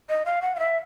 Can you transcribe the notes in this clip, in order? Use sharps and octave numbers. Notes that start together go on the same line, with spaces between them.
D#5
F5
F#5
F5
E5